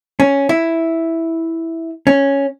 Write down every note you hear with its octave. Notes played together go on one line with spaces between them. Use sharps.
C#4
E4
C#4